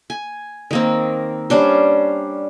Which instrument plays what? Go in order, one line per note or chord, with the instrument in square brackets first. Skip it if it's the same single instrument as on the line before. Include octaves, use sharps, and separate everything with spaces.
[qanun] G#5
D#3 A#3 C4
G3 C#4 D4 C5